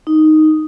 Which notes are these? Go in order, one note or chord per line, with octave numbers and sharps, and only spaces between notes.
D#4